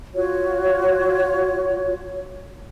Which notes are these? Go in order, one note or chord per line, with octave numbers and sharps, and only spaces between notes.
F4 F#4 C#5